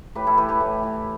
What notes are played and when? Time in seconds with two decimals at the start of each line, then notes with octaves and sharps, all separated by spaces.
0.15 A2 G4 B4
0.27 E4 A4
0.38 E3 G4 B4
0.49 G4 B4
0.60 A2
0.83 E3